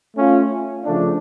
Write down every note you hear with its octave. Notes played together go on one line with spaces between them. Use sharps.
A3 C#4 F4
C#3 F3 A3 D4